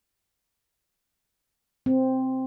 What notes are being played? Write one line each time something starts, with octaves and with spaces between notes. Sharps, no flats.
C4